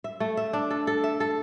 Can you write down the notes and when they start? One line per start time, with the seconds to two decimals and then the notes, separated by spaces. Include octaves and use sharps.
0.04 E5
0.20 A3
0.37 E5
0.53 D4
0.70 A4
0.87 A4
1.04 E5
1.20 A4